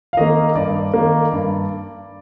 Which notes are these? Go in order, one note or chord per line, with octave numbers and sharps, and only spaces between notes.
F5
D#3 A#3 D#5
G2 D5
D#3 A#3
G2